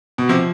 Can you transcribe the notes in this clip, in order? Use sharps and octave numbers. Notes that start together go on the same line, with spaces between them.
B2
C3 F3